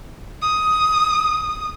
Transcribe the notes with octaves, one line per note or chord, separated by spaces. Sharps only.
D#6